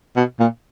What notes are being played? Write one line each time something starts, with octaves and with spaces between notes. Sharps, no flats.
B2
A#2